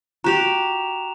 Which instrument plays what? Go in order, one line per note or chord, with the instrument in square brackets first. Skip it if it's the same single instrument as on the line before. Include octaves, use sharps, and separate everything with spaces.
[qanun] F#4 G4 [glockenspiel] A#5 E7 F7